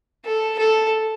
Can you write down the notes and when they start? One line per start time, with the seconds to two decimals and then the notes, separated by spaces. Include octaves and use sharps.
0.25 A4
0.59 A4